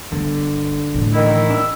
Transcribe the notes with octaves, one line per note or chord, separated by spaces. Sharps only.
G1 D3
A2 E3
D#3 D#4 E4
D4 E6